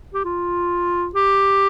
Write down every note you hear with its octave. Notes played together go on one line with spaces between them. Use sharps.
G4
F4
G4